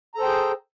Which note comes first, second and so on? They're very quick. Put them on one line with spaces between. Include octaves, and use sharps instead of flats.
A#5 A4 C5 G5 G#4